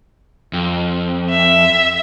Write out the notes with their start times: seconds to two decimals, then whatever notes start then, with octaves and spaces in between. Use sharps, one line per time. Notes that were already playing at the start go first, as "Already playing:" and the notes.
0.53 F2
1.31 E5